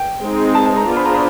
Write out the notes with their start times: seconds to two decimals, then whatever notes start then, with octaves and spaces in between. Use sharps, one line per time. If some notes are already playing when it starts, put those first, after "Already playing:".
Already playing: G5
0.21 G#3 C4 D#4 G#4
0.55 A5
0.66 A5
0.77 A#5
0.88 B3 D4 F4 G#4 C5
0.97 B5
1.05 A#5
1.14 B5